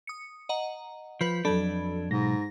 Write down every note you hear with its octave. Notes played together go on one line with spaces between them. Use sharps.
D#6 C#7
D#5 F#5 A#5
F3 B4 B5 G6
F2 F#3 D4 A4 B5 G#6
B1 G#2 G#3 A#6